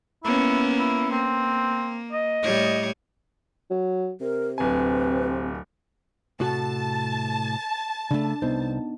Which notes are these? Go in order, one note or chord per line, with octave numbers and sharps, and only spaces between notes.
A#3 B3 C#4 E4
E4
A#3 C4
D#5
A2 G3 C#5
F#3
C3 A#4
D1 C4 B4 G#5
A2 C3 F#4 A5
C#3 A3 D4
C2 B3 D#4 C5